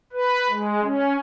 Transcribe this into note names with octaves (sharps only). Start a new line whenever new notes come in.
B4
G#3
C#4